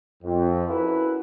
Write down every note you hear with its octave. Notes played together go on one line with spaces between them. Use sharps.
F2
C#4 E4 F#4 A#4 B4